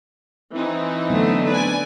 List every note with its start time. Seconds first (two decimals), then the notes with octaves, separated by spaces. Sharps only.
0.52 E3 C4 D#4
1.10 D3 F#3 A3 B3
1.47 B4 D5 G#5